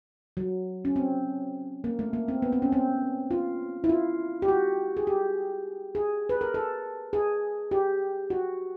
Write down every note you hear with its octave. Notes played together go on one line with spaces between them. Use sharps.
F#3
C#4
C4
A#3
A3
A#3
C4
B3
C4
C#4
C4
F4
E4
F4
G4
F#4
G#4
G4
G#4
B4
A#4
A4
G#4
G4
F#4